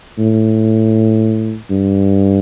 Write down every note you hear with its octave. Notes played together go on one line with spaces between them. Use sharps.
A2
G2